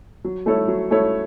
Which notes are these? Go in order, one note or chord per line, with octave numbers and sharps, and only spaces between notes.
F#3
A3 E4 A4 C#5
F#3
A3 E4 A4 C#5